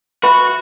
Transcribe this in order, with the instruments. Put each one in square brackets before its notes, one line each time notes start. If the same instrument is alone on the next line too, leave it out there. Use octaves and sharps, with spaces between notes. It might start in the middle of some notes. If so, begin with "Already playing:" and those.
[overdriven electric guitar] F#4 [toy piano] B4 E5 B5